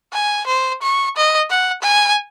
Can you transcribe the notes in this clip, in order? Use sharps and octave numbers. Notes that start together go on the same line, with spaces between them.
G#5
C5
C#6
D#5
F#5
G#5